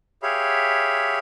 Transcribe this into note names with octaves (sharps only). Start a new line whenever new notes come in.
G4 G#4 C#5 E5 F5 B5